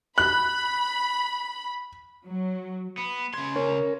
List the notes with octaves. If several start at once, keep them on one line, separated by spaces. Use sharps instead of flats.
B5 F#6
F#3
B3
C#3 C6 G#6
C#4 A#4